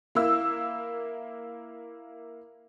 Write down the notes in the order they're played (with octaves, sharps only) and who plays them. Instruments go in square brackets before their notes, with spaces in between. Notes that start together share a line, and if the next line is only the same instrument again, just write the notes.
[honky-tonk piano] A#3 E4 E6